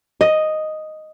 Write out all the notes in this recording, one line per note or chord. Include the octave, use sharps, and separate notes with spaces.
D#5